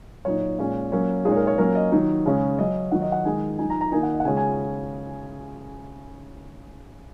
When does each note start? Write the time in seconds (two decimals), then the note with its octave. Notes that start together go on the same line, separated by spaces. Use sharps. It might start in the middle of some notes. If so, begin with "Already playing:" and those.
0.25 A#2 F#3 D#4 C#5
0.58 A#2 G#3 C#4
0.92 F#3 A#3 C#4
1.25 A#2 G#3 D#4 G#4
1.32 C#5
1.36 A#4
1.47 C#5
1.58 F#3 A#3 C#4 A#4
1.75 D#5
1.92 D#3 F#3 D#4
2.26 C#3 G#3 C#4
2.59 F#3 C#4 D#5
2.91 D#3 F#3 D#4 F#5
3.02 D#5
3.12 F#5
3.25 D#3 G#3 D#4 G#5
3.58 F#3 D#4 G#5
3.70 A#5
3.81 A#5
3.92 D#3 A#3 D#4 G#5
4.03 F#5
4.14 D#5
4.20 F#5
4.25 C#3 G#3 C#4 G#5
4.37 G#5